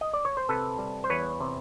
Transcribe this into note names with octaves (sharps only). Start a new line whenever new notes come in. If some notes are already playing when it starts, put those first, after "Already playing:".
D#5
D5
C#5
C5
C3 A4 B4
G3
C5
E2 B4 C#5
C3